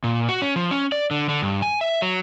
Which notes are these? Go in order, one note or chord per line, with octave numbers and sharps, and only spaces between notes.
A#2
F#4
C#4
F3
C#4
D5
D3
D3
G2
G#5
E5
F#3